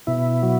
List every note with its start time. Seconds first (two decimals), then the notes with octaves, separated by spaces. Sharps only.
0.07 B2 E4
0.43 F#3